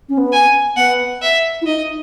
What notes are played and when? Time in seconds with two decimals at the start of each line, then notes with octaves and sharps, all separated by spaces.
0.09 C#4
0.18 B3
0.32 G#5
0.77 B3 F#5
1.22 E5
1.62 E4
1.66 D#4 D#5